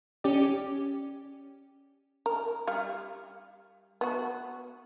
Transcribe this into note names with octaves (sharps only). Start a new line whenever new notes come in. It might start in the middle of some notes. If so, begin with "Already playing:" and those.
C#4 G4 D5
A#4
G3 F5
B3 F#4